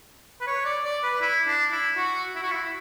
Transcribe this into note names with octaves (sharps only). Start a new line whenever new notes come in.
B4
C#5
D5
D5
B4
E4
D4
E4
F#4
E4
F#4
E4